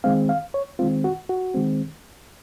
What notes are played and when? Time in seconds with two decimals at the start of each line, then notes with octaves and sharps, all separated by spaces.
0.04 D#3 G#3 C4 F5
0.29 F5
0.54 C#5
0.79 D#3 G#3 C4 F4
1.04 F#4
1.29 F#4
1.54 D#3 G#3 C4